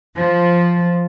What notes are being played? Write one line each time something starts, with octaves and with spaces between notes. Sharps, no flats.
F3